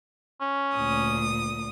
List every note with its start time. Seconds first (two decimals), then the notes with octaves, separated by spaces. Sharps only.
0.41 C#4
0.75 D2 A#2 D#6